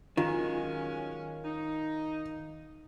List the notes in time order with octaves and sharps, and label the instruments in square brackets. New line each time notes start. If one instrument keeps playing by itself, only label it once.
[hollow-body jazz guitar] D#3 [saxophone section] F#3 G#3 C#4 [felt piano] F4
[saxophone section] D#4